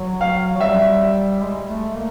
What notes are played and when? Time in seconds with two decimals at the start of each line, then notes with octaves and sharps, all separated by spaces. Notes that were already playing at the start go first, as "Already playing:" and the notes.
Already playing: F#3
0.21 F5
0.57 F#3
0.60 G3 E5
1.42 G#3
1.68 A3
1.95 A#3